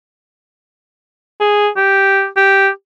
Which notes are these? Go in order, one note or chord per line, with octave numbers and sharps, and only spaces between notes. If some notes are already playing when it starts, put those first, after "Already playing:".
G#4
G4
G4